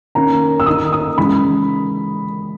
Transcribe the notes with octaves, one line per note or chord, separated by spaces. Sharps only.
D#3 A#3 C#4 A#5
E6
D#3 A#3 D#4 D#6
D#6
C#3 E3 G#3 D#4 B5